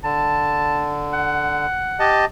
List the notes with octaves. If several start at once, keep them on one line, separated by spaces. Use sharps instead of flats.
D3 A5
F#5
G4 D#5 A5